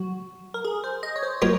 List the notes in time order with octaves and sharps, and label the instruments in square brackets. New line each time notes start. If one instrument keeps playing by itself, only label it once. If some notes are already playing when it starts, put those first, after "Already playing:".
Already playing: [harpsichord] F#3 [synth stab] F#4
[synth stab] A#4
G#4
C5
D#5
C#5
C5
[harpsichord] F#3 A#3 F4 A#4 D#5 [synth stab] C#5